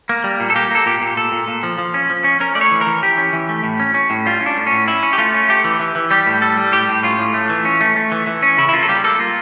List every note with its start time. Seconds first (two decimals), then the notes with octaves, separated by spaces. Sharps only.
0.09 A#3
0.24 G3
0.40 A#2
0.50 A4
0.56 A#3 G4
0.71 A#3 A4
0.86 A#2 G4
1.01 A#2
1.17 A#2 A4
1.32 A#2
1.48 A#2
1.63 F3
1.78 F3
1.94 C#4
2.10 F3
2.24 C#4
2.40 C#4 A#4
2.55 A3 D5
2.61 C#5
2.71 E3
2.81 A#4
2.86 E3
3.03 E3 G4
3.18 C#4
3.33 E3
3.49 A3
3.64 A2
3.80 C#4
3.94 C#4
4.10 A2
4.26 G3 F4
4.41 C#4
4.46 D4
4.57 A2
4.67 C#4
4.72 A2
4.87 C#4 E4
5.03 C#4
5.13 G4
5.18 A3 F4
5.34 C#4
5.49 A3 G4
5.64 E3
5.80 E3
5.95 E3
6.11 G3 G4
6.27 A2
6.42 G3 A4
6.57 G3
6.72 A2 G4
6.88 A2
7.03 C#4 F4
7.19 A2
7.34 A3
7.50 E3
7.65 C#4
7.81 A3
7.96 A3
8.12 E3
8.27 E3
8.43 C#4
8.58 C#3 E4
8.69 E4
8.73 A#3 F4
8.83 A4
8.88 G3 G4
9.04 A#3 A4
9.19 A#3 F4